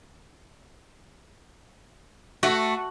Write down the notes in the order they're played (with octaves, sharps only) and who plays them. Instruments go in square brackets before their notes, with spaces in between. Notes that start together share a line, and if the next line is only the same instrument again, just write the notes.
[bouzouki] A3 [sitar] F#4